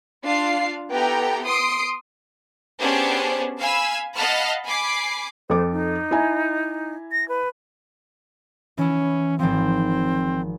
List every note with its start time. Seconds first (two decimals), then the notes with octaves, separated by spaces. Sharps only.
0.25 D4 F4 F5 C7
0.91 B3 E4 G4 A4 G5 A#5
1.45 C6 D#6 C7 D7
2.80 B3 C#4 D4 G4 G#4 C5
3.59 F5 G#5 B5 E6
4.15 D#5 F5 F#5 A5 B5 F6
4.65 G#5 B5 D6 C7
5.50 F2 A4 C5 D6
5.72 D#4
6.11 E4 G#5 A#5
7.12 A#6
7.29 B4
8.78 E3 C#4 E4
9.39 G#1 F3 C4